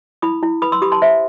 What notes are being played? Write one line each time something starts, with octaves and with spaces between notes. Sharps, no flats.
E4 B5 D#6
E4
B4 B5 D#6
C6 E6
G4 B5 D#6
A5 C6
C5 E5